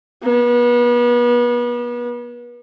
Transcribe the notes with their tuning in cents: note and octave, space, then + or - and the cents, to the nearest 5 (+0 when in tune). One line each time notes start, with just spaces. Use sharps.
B3 -35